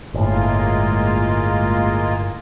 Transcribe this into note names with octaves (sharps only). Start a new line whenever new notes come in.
G1 A2 G#3 A#3 F4